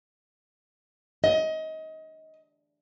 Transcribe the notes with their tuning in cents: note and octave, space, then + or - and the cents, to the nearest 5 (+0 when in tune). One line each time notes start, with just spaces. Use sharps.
D#5 +25